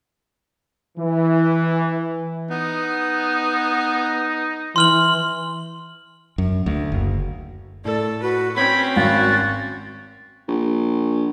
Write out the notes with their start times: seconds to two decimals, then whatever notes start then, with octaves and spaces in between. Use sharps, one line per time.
0.98 E3
2.50 B3 D#4
4.76 E3 C6 F6 F#7
6.38 F#2
6.66 D2
6.92 F#1
7.85 A2 A4 D5
8.22 F#4 B4
8.56 C4 C#4 C#5 B5
8.96 G#1 F#4 A6
10.48 A#1